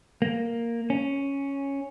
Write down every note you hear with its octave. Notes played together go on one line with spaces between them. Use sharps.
A#3
C#4